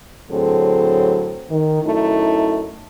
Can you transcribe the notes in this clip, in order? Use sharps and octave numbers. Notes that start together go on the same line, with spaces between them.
A2 D3 F#3 C4 G#4 A4
D#3
F#2 A3 D#4 E4